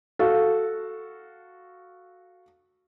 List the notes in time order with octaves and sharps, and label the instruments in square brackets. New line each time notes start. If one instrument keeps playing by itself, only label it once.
[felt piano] F#4 A4 F5